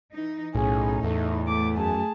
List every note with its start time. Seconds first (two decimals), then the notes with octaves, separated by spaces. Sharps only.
0.12 E3 D#4
0.55 B1 A2 C#4 D#4 G#4
1.03 E2 A3
1.48 A3 D6
1.78 F#2 G#4 A5